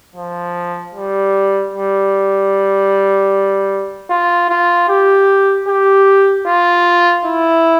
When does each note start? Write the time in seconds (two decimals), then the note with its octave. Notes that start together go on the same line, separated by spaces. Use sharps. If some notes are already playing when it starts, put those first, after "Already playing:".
0.15 F3
0.94 G3
1.74 G3
4.10 F4
4.50 F4
4.89 G4
5.68 G4
6.47 F4
7.26 E4